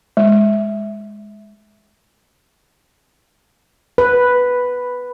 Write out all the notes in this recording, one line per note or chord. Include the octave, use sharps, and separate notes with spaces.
G#3
B4